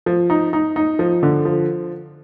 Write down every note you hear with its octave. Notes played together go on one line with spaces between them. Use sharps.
F3
D#4
D#4
D#4
F3
D3
F3